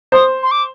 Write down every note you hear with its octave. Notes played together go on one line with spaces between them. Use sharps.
C5 D#6
C6
D6